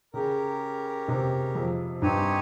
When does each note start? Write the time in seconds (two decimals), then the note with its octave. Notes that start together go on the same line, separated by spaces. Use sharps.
0.13 C#3 C#4 G4 A#4
1.08 C3
1.55 F2
2.02 G2 C4 D#4 G4 C#5 G#5